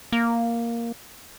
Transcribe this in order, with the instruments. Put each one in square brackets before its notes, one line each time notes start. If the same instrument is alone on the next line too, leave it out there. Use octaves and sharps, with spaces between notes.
[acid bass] A#3